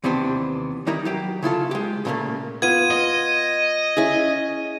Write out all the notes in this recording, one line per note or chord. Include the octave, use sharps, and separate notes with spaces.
D#2 C3 E3 B3 C4 D4
D#3 G3 D#4 E4 A#4 A#5
F#3 G4 G5
C#3 E4 F4 A4
G#3 G4
A#2 C#3 F#3 G3 A3 A#3
B3 F4 G#6 D#7
D#5
C#4 E4 G#4